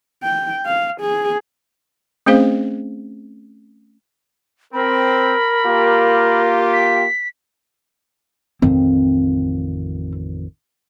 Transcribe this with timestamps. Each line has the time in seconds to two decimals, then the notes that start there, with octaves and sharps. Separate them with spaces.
0.24 G5
0.66 F5
1.01 G#4
2.26 A3 C4 C#4 G#4 C5 F5
4.73 C4 A#4 B5
5.64 A#3 F4 G4
6.73 B6
8.62 A1 F2 D#3 C4